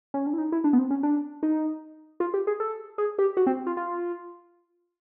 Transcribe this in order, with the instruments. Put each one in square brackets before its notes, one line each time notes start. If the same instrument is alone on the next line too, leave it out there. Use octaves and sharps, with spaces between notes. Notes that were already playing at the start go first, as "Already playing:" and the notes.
[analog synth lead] C#4
D4
E4
D#4
E4
D4
B3
C4
C#4
D4
D#4
F4
G4
G#4
A4
G#4
G4
F#4
C4
F4
F4